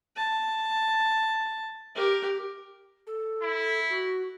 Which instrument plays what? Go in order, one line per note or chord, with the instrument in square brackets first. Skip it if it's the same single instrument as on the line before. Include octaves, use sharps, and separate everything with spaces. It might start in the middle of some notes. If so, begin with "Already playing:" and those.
[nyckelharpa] A5
G4 A#4
[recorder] A4
[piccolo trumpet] E4
[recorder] F#4